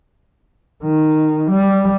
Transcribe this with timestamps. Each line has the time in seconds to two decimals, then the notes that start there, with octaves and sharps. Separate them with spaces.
0.84 D#3
1.51 G3